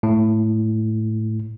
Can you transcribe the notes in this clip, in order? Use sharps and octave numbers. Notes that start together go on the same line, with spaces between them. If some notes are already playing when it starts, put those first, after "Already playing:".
A2